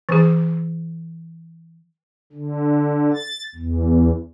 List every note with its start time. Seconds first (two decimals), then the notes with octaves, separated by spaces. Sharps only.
0.09 E3 G#4
2.33 D3
3.14 A6
3.55 E2